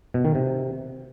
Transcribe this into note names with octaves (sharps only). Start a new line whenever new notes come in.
B2
D#3
C3